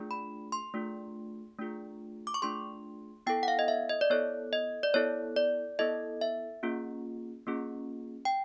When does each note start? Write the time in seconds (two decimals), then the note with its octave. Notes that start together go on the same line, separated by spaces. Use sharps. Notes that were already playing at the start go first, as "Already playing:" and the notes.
Already playing: A3 D4 F4 G#4
0.11 B5
0.52 C6
0.74 A3 D4 F4 G#4
1.58 A3 D4 F4 G#4
2.27 D6
2.34 C#6
2.42 A3 D4 F4 G#4 C6
3.27 B3 E4 A4 G5
3.43 F#5
3.48 F5
3.59 D#5
3.68 E5
3.89 D#5
4.01 D5
4.10 B3 E4 A4 C#5
4.53 D#5
4.83 D5
4.94 B3 E4 A4 C#5
5.36 D5
5.79 B3 E4 A4 D#5
6.21 E5
6.63 A#3 C#4 F4 G#4
7.47 A#3 C#4 F4 G#4
8.25 G5